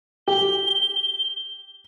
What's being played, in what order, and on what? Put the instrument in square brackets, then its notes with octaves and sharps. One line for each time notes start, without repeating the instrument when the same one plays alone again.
[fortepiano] G4 [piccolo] G7